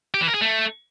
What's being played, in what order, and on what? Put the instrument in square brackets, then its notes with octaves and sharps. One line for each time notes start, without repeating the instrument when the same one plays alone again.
[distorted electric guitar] G4
E3
A#4
G#4
A3